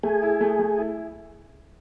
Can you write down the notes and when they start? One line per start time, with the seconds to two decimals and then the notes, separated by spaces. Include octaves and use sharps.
0.03 A3 G#4
0.22 E4
0.41 A3
0.59 A3
0.78 E4